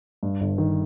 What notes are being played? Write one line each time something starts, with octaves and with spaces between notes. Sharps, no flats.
G2
G1
D#3